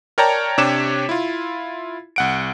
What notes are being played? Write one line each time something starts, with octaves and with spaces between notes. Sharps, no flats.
A#4 C#5 D5 G5 A5 A#5
C3 D4 G4 C#5 D6 E7
E4 F4
C2 F#5 D7